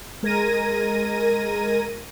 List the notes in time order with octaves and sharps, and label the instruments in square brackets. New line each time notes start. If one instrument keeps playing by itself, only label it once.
[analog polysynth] G#3 A#4 G#6 A#6 D#7